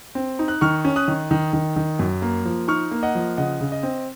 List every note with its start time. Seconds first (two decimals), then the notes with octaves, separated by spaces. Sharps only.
0.15 C4
0.39 D#4
0.48 F#6
0.61 D#3 C#6 F6
0.85 C#4
0.96 D#6 F#6
1.08 D#3
1.31 D#3
1.53 D#3
1.76 D#3
1.99 F#2
2.22 A#3
2.45 F3
2.68 D#4 C#6 F6
2.91 A#3
3.03 D#5 F#5
3.15 F3
3.37 C#3 D#5 F#5
3.61 C#3
3.72 D#5
3.83 C4